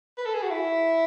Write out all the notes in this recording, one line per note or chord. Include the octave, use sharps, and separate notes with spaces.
B4
A4
G#4
F#4
E4